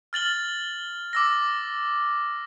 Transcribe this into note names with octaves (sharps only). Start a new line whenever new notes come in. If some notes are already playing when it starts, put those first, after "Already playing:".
F6 A6 F#7 G7
D6 E6 A#6